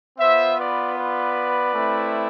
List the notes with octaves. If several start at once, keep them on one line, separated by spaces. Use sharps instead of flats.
B3 F4 C5 E5
B4 D5
B4 D5
A3 C4 E4